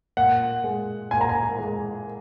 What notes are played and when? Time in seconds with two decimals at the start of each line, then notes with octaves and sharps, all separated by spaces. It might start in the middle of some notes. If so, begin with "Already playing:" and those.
0.17 A#2 F#5
0.64 G#3
1.11 A#2 G#5
1.21 A#5
1.29 G#5
1.58 G#3